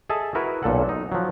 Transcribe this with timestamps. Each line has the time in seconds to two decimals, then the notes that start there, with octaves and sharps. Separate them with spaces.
0.10 G#4 A4 D#5 E5 A5
0.35 E4 F#4 A#4 B4
0.63 B1 A#2 A4 F#5
0.89 D#4
1.12 F3 F#3